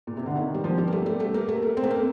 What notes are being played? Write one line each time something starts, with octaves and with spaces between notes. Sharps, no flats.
A#2
C3
D3
D#3
G3
F3
G3
A#3
A3
G3
A3
A#3
A3
A#3
C4
A3
A#3